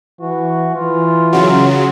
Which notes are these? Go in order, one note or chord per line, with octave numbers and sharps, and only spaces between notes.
E3 F#4
E3 F4
C#3 F#3